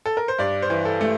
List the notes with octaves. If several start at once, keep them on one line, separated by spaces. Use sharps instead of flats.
A4
A#4
C5
G2 D5
C5
E3
A4
A3